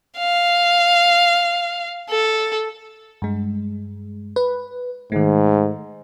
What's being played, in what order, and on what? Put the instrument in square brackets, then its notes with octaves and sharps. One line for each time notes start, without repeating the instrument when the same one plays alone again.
[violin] F5
A4
[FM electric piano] G2 G#3
B4
[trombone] G#2 [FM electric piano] D#3 A3